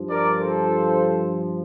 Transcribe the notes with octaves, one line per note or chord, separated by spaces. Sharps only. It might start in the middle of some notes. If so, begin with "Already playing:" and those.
Already playing: G2 F3
A#4 D5
A4 C5